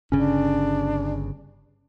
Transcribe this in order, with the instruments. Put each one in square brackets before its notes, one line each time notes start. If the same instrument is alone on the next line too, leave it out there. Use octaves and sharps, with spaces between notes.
[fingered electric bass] G1 C#3 [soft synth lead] C#4 [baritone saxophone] D4